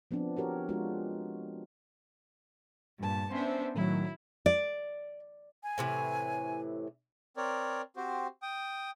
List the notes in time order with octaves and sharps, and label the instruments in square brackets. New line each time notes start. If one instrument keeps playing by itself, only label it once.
[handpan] F3 B3 C4 D4
F#4 G4 A#4 C#5
G#3 D4 F4 F#4
[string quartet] G2 A#2 A5
[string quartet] B3 C#4 D4 [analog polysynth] C5 E5
[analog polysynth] A2 D#3 F#3 [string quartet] E4
[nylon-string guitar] D5
[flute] G#5
[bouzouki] A2 C3 E3
[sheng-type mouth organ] C4 A#4 C#5 D5
C4 F#4 G4 C5
G5 D#6